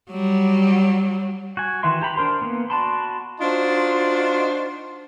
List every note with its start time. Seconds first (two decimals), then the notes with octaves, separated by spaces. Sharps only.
0.10 F#3 G3
1.57 F#4 G#5
1.83 D#3 E3 F#4 E5 C6
2.01 G4 A#5 B5
2.16 D4 A#4 C5 C6
2.41 A#3 B3
2.70 F#4 D5 A5 B5 C6
3.40 D4 D#4 F4 F#4 C5